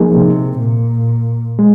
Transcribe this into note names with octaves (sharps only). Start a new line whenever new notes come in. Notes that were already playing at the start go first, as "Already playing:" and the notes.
Already playing: F3 A#3 D#4 G#4
C3
A#2
G#3